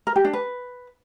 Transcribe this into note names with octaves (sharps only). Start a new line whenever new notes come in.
A#4
G4
D4
B4